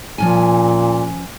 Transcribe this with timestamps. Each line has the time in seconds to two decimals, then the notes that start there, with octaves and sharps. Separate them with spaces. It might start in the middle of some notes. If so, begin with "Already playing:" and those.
0.18 A#2 F3 C#4 G#5